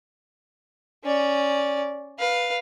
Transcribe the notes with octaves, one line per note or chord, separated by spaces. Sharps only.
C#4 D5
B4 F5